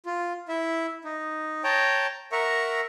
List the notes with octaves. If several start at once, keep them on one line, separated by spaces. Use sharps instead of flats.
F4
E4 E5
D#4
C#5 G5 A5 A#5
A#4 E5 F#5 A#5 C#6